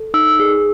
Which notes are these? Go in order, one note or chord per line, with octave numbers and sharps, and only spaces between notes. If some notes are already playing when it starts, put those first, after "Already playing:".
Already playing: A4
D#4 E6
G#4